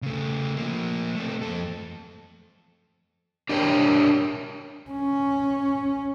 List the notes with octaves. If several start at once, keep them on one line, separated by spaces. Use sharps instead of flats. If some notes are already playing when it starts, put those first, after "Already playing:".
C#3 A3
F3 A#3
A3 C4
F2 A4
D4 G4 A#4 C#5 G5
C#4